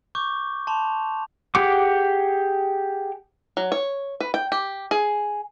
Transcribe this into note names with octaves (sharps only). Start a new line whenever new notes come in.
C#6 D6 G6
A5 C6 F7
G4 G#4 F#5 D6
F#3
C#5
B4
G5
G4
G#4